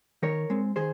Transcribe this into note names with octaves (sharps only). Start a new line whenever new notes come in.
D#3 A#4 C#5
G#3 C4
D#3 G#4 C5